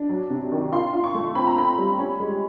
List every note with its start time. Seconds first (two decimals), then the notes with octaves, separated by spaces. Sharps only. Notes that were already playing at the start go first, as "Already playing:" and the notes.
Already playing: D4
0.09 F#3
0.30 C3
0.52 D#3
0.72 F4 C6
0.93 F4
1.04 C#6
1.14 A3
1.35 C4 B5
1.47 A#5
1.56 C4 B5
1.78 G3
1.99 C#4
2.20 G#3